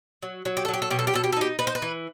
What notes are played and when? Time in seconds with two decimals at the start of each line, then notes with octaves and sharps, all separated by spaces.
0.22 F#3
0.45 F#3
0.57 G4
0.65 A4
0.68 F#3
0.74 G4
0.82 A4
0.90 B2 G4
0.99 A4
1.07 G4
1.14 B2 A4
1.24 G4
1.32 A4
1.37 D#4 G4
1.59 D#4 B4
1.67 C5
1.75 B4
1.82 E3